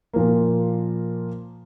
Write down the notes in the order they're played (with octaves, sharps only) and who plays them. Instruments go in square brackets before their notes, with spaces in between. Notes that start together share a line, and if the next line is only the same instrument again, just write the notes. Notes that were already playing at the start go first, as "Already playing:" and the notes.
[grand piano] A#2 F3 A#3